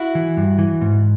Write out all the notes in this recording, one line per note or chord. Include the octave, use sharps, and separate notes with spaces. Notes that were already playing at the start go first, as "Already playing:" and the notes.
Already playing: E4 F#4
E3
G2
E3
G#2